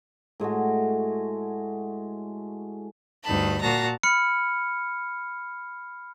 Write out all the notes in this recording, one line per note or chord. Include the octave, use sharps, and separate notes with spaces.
A2 G#3 A3 F#4
D2 G2 D#4 A5 B5
A#2 F#4 A5 A#5 A#6
B5 F6 C#7